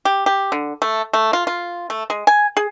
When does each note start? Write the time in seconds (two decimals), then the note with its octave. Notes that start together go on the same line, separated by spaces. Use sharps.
0.05 G4
0.26 G4
0.52 D3
0.82 A3
1.13 A3
1.33 F4
1.47 F4
1.90 A3
2.10 G#3
2.27 G#5
2.57 G#4